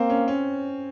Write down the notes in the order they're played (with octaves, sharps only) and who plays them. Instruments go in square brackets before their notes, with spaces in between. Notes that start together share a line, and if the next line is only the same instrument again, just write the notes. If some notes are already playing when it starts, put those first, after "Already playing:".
Already playing: [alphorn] A#3 [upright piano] C4
[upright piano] C#4
C#4